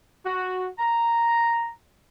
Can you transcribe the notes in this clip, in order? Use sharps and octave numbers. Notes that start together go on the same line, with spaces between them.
F#4
A#5